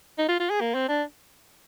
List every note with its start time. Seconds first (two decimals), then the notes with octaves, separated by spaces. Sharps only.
0.18 D#4
0.28 F4
0.40 F4
0.50 G#4
0.61 A#3
0.74 C4
0.88 D4